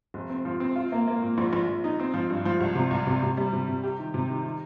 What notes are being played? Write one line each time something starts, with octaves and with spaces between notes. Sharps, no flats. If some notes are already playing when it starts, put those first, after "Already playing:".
F1
C4
F3
C4
F4
A#3
A#3
A#2
A#1
A#1
A#1
D#4
C4
F3
G2
F3
C2
C3
C2
C3
C3
G3
C3
C3
G4
D#3
C3
D#3
D#3